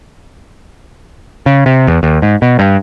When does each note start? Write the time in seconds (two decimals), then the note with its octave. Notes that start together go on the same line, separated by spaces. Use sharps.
1.46 C#3
1.66 C3
1.87 E2
2.03 D#2
2.22 G#2
2.42 B2
2.59 G2